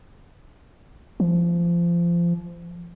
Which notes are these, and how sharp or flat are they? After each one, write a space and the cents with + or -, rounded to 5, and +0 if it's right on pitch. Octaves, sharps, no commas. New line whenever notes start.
F3 -25